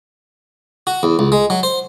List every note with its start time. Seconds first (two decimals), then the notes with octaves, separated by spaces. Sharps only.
0.87 F#4
1.03 E2
1.19 C#2
1.32 G#3
1.50 F#3
1.63 C5